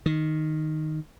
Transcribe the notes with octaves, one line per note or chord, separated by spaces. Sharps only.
D#3